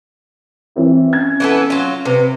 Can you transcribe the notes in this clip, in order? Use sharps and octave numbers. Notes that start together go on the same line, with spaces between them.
E3 C4 E4
C#4 G#6
E3 B3 A4
F#3 F4
C3 B4